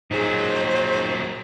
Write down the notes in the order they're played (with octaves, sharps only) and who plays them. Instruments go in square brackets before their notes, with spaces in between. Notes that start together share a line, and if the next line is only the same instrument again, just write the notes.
[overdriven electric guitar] A#2 F#3 [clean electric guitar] D#4 G#4 [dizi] C5